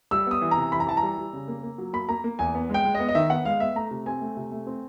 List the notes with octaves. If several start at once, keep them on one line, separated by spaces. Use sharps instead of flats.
G3 E6
B3 D#6
E3
A#5
C3
E3 B5
A#5
E3 A5
A#5
G3
G3
C#3
A#3
A#3
F#3
A#3 B5
A#3 A#5
A#3
E2 G#5
B3
G#3 G5
G#3
D#5
B3
D#5
D#3 E5
B3 F#5
G#3 F5
B3 E5
A3 A#5
C3
C4 G#5
A3
C3
A3
C4